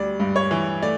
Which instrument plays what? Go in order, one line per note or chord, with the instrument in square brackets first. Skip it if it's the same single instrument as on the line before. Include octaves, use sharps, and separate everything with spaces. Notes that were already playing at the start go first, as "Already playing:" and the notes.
Already playing: [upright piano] D2 G3 D5
G2
C#5
E3
A3 D5